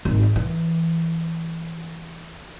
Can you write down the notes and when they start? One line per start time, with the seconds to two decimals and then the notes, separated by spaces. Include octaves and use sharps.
0.05 G#1
0.36 E3